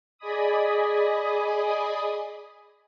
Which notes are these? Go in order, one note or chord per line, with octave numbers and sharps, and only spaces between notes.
G#4 D5 D#5 G#5 B5 D#6